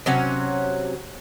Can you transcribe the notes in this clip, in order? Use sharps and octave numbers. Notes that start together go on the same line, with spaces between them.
C3 F#3 C#4 F#5